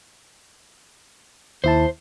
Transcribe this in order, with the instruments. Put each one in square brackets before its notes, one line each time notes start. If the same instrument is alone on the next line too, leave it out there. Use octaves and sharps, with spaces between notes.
[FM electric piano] D#2 E4 A5 [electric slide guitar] C5